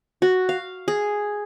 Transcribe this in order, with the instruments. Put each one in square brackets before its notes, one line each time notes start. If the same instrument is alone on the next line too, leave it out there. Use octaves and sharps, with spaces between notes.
[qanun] F#4
F5
G#4